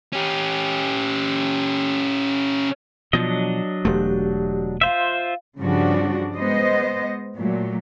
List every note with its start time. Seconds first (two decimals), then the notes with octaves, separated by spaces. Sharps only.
0.13 C#4 G4
3.13 B2 F3 F#3 D4 D#5
3.85 E1 A3 G4
4.81 F4 C5 E5 F5
5.58 G2 C#3 F3 G3 D4 F#4
6.36 G#3 B3 C5 D#5
7.37 A#2 F#3 A3